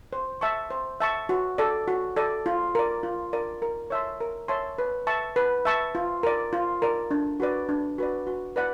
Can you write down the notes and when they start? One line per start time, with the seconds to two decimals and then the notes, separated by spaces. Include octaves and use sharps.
0.13 C5
0.41 E5 A5 C#6
0.71 C5
1.00 E5 A5 C#6
1.29 F#4
1.58 A4 D5
1.88 F#4
2.16 A4 D5
2.46 F4
2.75 A#4 D5
3.03 F4
3.33 A#4 D5
3.62 A#4
3.90 C#5 E5 A5 C6
4.20 A#4
4.48 C#5 E5 A5 C6
4.78 B4
5.07 E5 A5 C#6
5.36 B4
5.65 E5 A5 C#6
5.95 F4
6.23 A#4 D5
6.53 F4
6.82 A#4 D5
7.11 D4
7.40 F#4 B4 D5
7.69 D4
7.98 F#4 B4 D5
8.27 F#4
8.56 B4 D5 F#5 B5